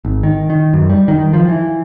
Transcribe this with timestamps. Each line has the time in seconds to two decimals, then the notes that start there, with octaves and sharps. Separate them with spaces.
0.05 G#1
0.23 D#3
0.50 D#3
0.73 F#2
0.90 G3
1.08 D#3
1.33 F3
1.49 E3